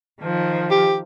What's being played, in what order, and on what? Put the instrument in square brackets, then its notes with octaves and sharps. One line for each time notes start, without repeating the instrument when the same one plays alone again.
[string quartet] D#3 F3
[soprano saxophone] G4